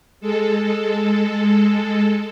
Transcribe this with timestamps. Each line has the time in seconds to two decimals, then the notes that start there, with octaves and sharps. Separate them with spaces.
0.21 G#3 A4